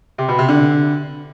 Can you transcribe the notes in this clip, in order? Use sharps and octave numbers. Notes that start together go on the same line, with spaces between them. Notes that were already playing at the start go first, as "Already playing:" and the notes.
C3
B2
C3
D3